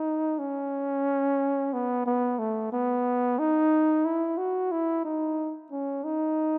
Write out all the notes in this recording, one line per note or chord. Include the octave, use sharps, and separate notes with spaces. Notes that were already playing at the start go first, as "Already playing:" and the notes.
Already playing: D#4
C#4
B3
B3
A3
B3
D#4
E4
F#4
E4
D#4
C#4
D#4